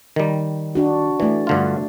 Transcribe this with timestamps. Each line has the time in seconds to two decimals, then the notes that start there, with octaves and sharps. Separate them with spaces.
0.16 D#3 G3
0.75 D4 F#4
1.20 E3 A3 D5
1.47 G2 D3 F4